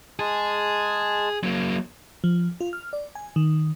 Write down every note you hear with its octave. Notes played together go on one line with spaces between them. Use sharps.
G#3 G#4 A5
F#3 A#3
F3
F4
F6
D5
G#5
D#3